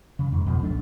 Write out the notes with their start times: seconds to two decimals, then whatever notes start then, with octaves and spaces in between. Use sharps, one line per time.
0.19 C#3
0.32 F2 G#2
0.46 F2 B2 F3
0.63 D1 B1 A3 D4